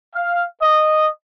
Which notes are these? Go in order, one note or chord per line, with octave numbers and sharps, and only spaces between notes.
F5
D#5